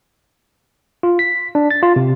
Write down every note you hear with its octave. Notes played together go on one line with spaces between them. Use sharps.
F4
B6
D4
A6
F4
C3